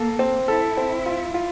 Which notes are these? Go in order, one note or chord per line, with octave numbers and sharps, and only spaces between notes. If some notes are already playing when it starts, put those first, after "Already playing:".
Already playing: A#3 A4
C4
E4 A4
C4
F4
F4